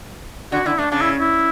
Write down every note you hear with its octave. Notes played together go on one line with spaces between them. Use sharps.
D3 F#4
D3 E4
A3 D4
C#3 D4
E4
E4